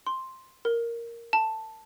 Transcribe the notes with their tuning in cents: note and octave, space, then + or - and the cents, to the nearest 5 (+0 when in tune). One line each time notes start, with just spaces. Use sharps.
C6 +5
A#4 +0
A5 +0